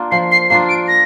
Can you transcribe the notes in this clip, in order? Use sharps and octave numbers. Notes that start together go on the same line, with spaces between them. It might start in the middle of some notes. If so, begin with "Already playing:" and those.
Already playing: A#3 D4 F4
F3 C7
C7
A#3 D4 F4 C7
D7
A#6